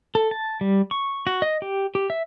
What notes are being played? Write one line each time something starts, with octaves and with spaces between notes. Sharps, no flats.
A4
A5
G3
C#6
F#4
D#5
G4
G4
E5